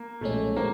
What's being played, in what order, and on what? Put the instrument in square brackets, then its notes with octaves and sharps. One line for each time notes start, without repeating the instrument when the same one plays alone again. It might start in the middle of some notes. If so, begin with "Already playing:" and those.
Already playing: [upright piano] A#3
[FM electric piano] B1 A#2 F3 G#3 C#4 [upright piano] A3
[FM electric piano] G#3 C4 [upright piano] A#3